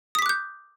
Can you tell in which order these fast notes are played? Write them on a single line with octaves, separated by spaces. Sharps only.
D#6 B6 D6 F#6 G6